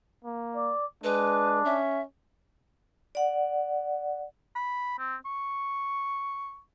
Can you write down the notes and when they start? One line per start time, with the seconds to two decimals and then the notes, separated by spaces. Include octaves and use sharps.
0.24 A#3
0.55 D5
1.04 G#3 D4 B4
1.65 C#4 E5
3.15 D5 F#5
4.56 B5
4.99 C4
5.25 C#6